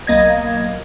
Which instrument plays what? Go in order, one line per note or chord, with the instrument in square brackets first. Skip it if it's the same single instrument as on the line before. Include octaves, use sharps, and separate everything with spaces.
[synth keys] B1 A#3 D#5 G#6